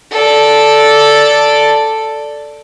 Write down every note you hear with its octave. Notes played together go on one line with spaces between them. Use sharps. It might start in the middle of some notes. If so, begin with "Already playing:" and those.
A4 D5